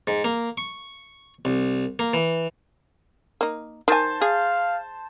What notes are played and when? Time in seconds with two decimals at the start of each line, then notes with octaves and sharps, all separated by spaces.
0.07 G#2
0.24 A#3
0.57 C#6
1.45 C2
1.99 A#3
2.13 E3
3.41 A#3 D#4
3.88 D#3 C5 G#5 A5
4.21 G#4 F5